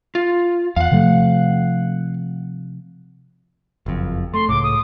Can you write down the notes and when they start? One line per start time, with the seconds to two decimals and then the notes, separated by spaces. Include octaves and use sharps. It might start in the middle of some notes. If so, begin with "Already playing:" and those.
0.15 F4
0.76 E2 F5 F#5
0.92 C3 F3 A3
3.86 F#1 F2
4.34 A3 C6
4.49 C#2 A2 D6
4.64 D#6